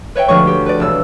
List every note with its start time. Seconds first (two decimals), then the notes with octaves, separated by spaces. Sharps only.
0.15 B4 C#5 E5 G5
0.28 D2 F3 G#3 G#4 C#5 C#6
0.47 G4
0.66 B4 D5
0.80 E1 E6